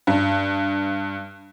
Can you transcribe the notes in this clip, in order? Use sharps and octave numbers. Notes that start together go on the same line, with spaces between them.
G2